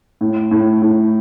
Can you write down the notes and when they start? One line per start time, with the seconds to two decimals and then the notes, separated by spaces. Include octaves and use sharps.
0.21 A2
0.51 A2
0.82 A2